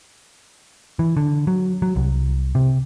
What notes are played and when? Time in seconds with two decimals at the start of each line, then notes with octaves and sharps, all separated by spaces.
0.99 E3
1.17 D3
1.47 F#3
1.82 F#3
1.96 C2
2.55 C3